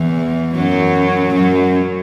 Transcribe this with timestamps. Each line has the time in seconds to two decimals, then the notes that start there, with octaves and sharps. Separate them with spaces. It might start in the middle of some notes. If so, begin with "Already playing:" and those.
Already playing: E2 E3
0.55 F#2 F#3
1.34 F#2 F#3